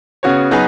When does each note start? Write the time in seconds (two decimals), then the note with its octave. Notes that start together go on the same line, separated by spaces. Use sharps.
0.23 C#3 B3 F#4 C#5
0.51 F#3 B3 D#4 G#4 B4